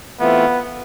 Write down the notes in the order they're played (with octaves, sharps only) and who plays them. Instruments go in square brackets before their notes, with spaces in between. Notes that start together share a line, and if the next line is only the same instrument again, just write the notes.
[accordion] E3 A3 C4 F4 [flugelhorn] B3